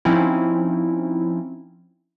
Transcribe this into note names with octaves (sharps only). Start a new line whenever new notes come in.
F3 C4 C#4 D#4 E4